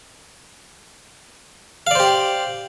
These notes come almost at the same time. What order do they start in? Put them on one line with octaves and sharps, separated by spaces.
F5 D5 C5 G4